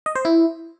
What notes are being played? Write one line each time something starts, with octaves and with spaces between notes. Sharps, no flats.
D#5
C5
E4